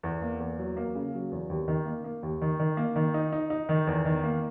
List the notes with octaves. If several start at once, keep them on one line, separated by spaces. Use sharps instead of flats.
E2
A#3
E2
F#3
A#3
C#3
F#3
E2
D#2
D#3
A#3
A#3
D#2
D#3
D#3
A#3
D#3
D#4
D#4
D#4
D#3
E2
D#3
A#3